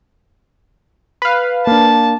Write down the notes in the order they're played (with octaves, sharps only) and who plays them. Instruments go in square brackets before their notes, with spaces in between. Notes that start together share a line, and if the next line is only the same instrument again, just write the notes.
[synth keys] B4 F5
[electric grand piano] A#3 D4 [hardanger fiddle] A5